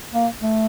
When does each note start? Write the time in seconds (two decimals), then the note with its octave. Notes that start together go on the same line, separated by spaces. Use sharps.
0.13 A#3
0.41 A3